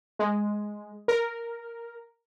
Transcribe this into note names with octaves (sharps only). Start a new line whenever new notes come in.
G#3
A#4